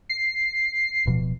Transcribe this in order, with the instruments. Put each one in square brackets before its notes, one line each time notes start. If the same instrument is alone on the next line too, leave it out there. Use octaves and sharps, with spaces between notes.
[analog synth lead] C7
[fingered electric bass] D1 B2 F3